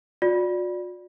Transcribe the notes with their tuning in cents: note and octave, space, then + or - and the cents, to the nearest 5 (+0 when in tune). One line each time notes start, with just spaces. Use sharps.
F#4 -45 D5 +0